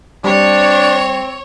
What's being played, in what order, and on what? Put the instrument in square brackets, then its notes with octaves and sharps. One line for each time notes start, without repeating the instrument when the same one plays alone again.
[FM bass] G3 [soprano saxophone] C4 [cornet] D4 [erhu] C#5